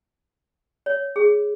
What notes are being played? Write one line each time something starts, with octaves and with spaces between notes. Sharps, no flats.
C#5
G#4